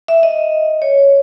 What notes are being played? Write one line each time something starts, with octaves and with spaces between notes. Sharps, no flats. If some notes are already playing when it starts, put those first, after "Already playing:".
E5
D#5
C#5